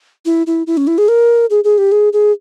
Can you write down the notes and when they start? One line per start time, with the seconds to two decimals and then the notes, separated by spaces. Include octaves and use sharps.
0.25 E4
0.47 E4
0.67 E4
0.77 C#4
0.87 E4
0.98 G#4
1.08 A#4
1.50 G#4
1.64 G#4
1.78 G4
1.92 G#4
2.13 G#4